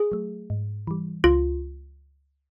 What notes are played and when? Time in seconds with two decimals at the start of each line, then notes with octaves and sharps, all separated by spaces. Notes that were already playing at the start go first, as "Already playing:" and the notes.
Already playing: G#4
0.12 F#3 A3
0.50 G#2
0.87 E3 G3
1.24 C#2 F4